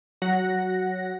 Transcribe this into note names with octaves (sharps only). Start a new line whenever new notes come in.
F#3 F#5 A#6